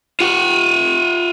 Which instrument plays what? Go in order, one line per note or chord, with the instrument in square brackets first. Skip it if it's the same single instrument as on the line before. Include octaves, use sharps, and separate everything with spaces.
[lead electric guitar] F4 F#5